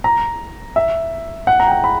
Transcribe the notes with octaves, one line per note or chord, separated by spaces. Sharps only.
A#5
E5
F#5
A#5
G5
A#5
B5